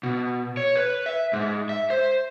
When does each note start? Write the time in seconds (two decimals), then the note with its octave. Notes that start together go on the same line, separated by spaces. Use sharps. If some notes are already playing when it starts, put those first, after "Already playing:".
0.03 B2
0.57 C#5
0.76 B4
1.06 E5
1.33 G#2
1.69 E5
1.90 C5